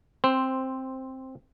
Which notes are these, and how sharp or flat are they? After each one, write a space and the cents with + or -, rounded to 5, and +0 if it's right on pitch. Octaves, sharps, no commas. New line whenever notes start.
C4 +5 C5 +0